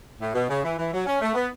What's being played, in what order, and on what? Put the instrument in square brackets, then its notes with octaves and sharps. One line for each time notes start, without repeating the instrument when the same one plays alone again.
[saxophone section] A2
B2
C#3
E3
E3
F#3
C#4
A3
B3